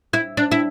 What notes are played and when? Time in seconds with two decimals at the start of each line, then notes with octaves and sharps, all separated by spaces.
0.13 E4
0.37 D4
0.52 E4